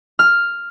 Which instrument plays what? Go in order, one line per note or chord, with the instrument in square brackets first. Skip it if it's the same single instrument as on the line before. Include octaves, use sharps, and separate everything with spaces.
[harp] F6